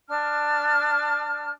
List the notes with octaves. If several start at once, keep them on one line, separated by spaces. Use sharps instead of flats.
D4 A5 F6